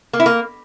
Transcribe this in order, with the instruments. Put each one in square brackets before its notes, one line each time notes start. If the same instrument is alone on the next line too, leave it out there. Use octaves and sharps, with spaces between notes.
[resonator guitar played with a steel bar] A#3
E4
A#3